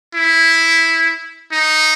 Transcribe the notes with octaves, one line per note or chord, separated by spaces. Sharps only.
E4
D#4